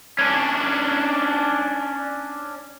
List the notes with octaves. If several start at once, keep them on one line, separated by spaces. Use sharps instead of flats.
C#4 D4